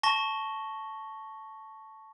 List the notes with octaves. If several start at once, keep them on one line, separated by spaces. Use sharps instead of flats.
A5 C#6 A#6 G7